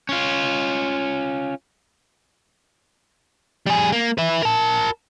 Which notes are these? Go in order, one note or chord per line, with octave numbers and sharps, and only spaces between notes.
C#4 F4
G3 G#4
A#3
B4 E5
A#4 A5